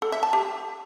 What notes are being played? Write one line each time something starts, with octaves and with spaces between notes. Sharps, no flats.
A4
E5
A5
G4